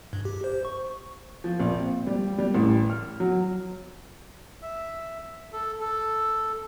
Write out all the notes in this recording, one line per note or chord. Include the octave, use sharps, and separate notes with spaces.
G2
G4
C5
C#6
F3
A#1
C4
G3
G3
A1
F6
F#3
E5
A4
A4